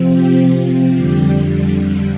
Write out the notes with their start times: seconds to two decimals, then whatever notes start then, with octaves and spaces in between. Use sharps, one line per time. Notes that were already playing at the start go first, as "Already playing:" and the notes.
Already playing: C3 F3 C4
0.11 G4
0.96 F2 D3 G3 G4